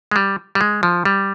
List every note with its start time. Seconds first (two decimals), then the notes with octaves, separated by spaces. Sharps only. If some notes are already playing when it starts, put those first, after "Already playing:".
0.11 G#3
0.16 G3
0.55 G3
0.61 G#3
0.83 F3
1.05 G3